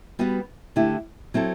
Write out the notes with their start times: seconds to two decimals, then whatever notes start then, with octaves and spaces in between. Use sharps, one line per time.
0.19 G3 B3 F#4 B4
0.76 D3 A3 E4 G4
1.34 F#3 C4 E4 A4